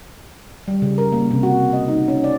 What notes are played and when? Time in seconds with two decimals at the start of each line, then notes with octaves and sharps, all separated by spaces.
0.68 G3
0.82 C#3
0.98 A#4
1.12 A#3
1.31 C3
1.43 F#4
1.73 D#5
1.88 D#4
2.08 C#4
2.24 D5